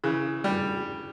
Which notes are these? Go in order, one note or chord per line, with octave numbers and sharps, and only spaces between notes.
C#3 E3
G3